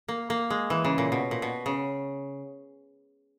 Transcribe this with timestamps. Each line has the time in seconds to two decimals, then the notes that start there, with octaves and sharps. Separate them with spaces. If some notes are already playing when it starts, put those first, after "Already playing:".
0.08 A#3
0.30 A#3
0.50 G#3
0.70 E3
0.85 C#3
0.98 A#2
1.12 B2
1.31 A#2
1.42 B2
1.66 C#3